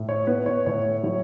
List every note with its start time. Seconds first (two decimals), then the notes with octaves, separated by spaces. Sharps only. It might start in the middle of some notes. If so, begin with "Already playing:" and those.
Already playing: A2
0.09 C#5
0.27 B3 B4
0.46 C#5
0.66 A2 C#5
1.03 F#3 C#5